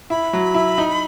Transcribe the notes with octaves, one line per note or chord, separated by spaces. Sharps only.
E4 B5
F#3
E4
D#4